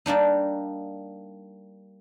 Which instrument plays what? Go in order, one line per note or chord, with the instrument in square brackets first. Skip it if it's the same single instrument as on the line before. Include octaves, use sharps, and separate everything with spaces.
[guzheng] G3 A#3 D4 D#4